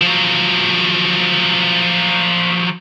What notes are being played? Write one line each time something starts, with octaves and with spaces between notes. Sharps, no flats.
F3 F#3